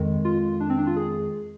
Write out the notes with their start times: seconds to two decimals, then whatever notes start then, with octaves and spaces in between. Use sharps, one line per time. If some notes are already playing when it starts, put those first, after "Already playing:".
Already playing: F2 D#3 G#3
0.25 F4
0.60 D4
0.70 C4
0.78 D4
0.87 F4
0.96 G#4